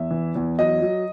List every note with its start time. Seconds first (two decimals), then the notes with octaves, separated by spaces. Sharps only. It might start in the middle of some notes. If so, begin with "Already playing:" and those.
Already playing: E2 E5
0.11 E3
0.35 E2
0.59 F#3 D#5
0.82 F#3